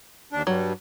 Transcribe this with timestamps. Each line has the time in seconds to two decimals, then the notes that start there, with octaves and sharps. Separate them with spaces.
0.33 D#2 D4
0.47 G2 F#3 G3